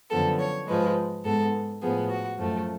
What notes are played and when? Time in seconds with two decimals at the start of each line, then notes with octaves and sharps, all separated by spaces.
0.10 F#2 D3 F3 B3 A4
0.39 C#5
0.67 G#2 F3 G#3 B4
1.24 G#2 G#3 B3 A4
1.81 A2 F3 B3 G#4
2.10 F#4
2.38 F#2 F3 A3